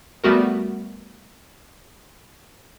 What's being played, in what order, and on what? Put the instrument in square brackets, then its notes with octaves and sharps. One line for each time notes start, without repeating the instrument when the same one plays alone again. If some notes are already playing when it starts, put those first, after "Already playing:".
[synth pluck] G3 A3 B3 F#4 A#4